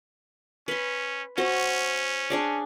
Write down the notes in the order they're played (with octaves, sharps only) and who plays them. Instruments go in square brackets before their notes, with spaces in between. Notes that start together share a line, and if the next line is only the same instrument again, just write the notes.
[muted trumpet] C#4 [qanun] B4 C6
[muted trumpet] C#4 [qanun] F#4 C5
[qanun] D4 G#4 D5